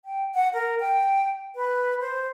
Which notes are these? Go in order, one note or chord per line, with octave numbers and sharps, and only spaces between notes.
G5
F#5
A#4
G5
B4
C5